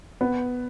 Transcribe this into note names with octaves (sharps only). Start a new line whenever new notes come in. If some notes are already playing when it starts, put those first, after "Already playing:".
B3